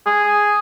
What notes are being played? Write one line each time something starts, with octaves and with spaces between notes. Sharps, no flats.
G#4